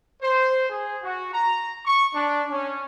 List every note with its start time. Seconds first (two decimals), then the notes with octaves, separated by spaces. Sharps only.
0.22 C5
0.70 G#4
1.03 F#4
1.33 A#5
1.86 C#6
2.14 D4
2.49 C#4